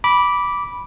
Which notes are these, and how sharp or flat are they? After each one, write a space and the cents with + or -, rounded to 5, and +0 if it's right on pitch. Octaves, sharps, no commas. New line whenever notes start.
B5 -10 D6 -10